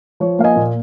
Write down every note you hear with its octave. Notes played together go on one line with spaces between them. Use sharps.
F3 C#5
A#3 F5
D#5 G#5
A#2